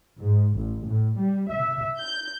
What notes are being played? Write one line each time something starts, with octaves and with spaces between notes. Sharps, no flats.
G#2
A1
A2
G3
E5
G6